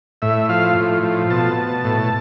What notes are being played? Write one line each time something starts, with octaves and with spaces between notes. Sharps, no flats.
A2 E5
F3 F5
A2
F3
B2 A5
B2
A2